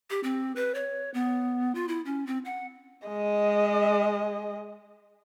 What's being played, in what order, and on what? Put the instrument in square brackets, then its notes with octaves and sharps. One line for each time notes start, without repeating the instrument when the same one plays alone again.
[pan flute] G4
C4
B4
C#5
B3
F4
E4
C#4
C4
F#5
[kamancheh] G#3 D#5